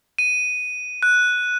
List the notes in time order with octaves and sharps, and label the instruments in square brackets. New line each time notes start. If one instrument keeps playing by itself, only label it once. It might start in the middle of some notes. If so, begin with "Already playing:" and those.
[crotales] D#7
F#6